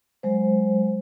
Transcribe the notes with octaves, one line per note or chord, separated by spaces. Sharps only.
F#3 G#3 C5